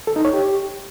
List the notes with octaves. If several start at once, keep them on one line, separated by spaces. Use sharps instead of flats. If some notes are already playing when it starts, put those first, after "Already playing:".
A4
D#4
C#5
G4